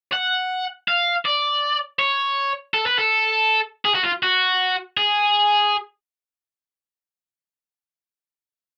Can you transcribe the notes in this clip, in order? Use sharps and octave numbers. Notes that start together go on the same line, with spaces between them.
F#5
F5
D5
C#5
A4
B4
A4
G#4
F#4
F4
F#4
G#4